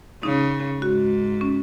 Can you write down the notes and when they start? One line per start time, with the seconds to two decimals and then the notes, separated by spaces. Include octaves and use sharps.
0.23 C#3 D#4
0.82 G#2 F#4
1.41 C#4